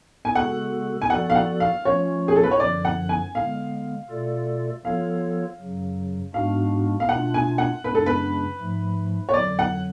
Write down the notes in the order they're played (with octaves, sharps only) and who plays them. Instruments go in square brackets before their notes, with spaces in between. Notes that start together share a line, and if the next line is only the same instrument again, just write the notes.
[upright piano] G#5
[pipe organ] C#3 G#3 B3 F#4 A4 [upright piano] F#5
[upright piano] G#5
[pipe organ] F3 B3 F#4 A4 D5 [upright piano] F#5
[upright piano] F5
F#5
F5
[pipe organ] F3 A3 C#4 F4 [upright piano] C#5
[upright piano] G#4
A4
B4
C#5
[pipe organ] F#2 D3 F3 [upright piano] D5
[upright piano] F#5
G#5
[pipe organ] D3 G#3 B3 [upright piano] F5
[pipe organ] B2 A3 F4 A4 D5
[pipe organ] F3 B3 F4 A4 C#5 [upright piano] F5
[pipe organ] F#2 C#3 F#3
[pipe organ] G#2 G#3 B3 D4 F#4 [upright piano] F5
[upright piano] F5
[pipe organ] B2 A3 D4 F4 [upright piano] F#5
[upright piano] G#5
F#5
[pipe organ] F#2 C#3 G#3 B3 D4 [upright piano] B4
[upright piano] A4
B4
[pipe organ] G#2 F3 A3
[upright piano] C#5
[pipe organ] F2 D3 F#3 [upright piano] D5
[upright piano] F#5